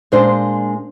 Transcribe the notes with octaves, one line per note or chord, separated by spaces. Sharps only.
A#2 G#3 D4 C5